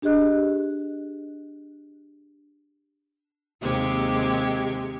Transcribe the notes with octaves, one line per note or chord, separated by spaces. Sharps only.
D4 G4 G#4 D#5 F#6
D#2 C3 G#3 G4 G#6